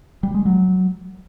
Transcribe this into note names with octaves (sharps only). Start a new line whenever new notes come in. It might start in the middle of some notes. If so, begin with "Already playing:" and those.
G3
G#3
F#3